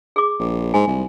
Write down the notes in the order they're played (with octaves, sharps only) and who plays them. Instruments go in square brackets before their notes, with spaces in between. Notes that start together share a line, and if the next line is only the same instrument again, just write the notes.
[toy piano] G#4 D6
[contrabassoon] A#1
[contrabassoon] G#2 [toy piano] G#5
[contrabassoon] C2